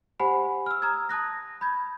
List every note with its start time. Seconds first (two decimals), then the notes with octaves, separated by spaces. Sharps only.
0.20 G4 C5 F#5 G#5 B5
0.66 E6 F6
0.82 A#5 D#6 F6 G#6
1.09 A5 D#6 F#6 A#6
1.61 B5 G6 G#6